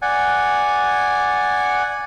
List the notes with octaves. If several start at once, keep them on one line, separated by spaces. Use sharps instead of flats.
D5 F#5 G#5